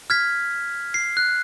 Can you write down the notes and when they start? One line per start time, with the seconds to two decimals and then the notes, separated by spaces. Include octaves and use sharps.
0.10 F6 G#6 B6
0.94 C7
1.17 F#6